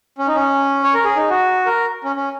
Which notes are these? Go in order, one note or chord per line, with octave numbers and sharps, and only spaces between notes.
C#4
D#4
C#4
C#5
A#4
G#4
D#4
F#4
A#4
C#4
C#4